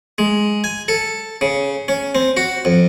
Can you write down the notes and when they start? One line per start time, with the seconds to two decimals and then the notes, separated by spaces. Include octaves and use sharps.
0.18 G#3
0.64 G#5
0.88 A4
1.41 C#3
1.88 C#4
2.15 C4
2.37 F#4
2.65 F2